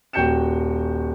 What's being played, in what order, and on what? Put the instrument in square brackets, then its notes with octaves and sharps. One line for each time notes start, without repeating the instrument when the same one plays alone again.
[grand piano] D#1 F#4 G5 G6 C#7 E7